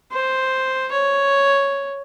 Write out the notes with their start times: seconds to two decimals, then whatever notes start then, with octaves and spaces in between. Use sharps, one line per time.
0.12 C5
0.92 C#5